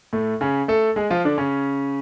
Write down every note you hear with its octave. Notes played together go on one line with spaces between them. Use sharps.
A2 A3
C#3 C#4
A3 A4
G#3 G#4
F3 F4
D3 D4
C#3 C#4